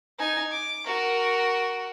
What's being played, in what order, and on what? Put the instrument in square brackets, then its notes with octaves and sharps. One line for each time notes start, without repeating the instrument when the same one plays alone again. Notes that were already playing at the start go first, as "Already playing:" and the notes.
[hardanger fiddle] D#4 G#5
D6
F#4 A#4